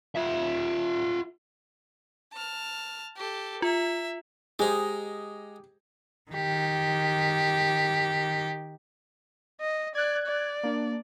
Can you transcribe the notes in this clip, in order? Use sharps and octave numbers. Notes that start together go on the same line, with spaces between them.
F4 E5
A5 F6
G4 A4
F4 E5
G#3 D#4 G4 G#4 C5
D#3 G4
D#5
D5 F#6 G#6
D5
A#3 D4